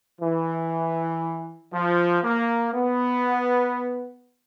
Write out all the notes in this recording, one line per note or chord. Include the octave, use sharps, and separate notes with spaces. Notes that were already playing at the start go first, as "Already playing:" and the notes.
E3
F3
A#3
B3